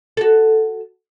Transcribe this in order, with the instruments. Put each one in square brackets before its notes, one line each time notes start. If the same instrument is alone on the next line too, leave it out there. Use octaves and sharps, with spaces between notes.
[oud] F#4 A4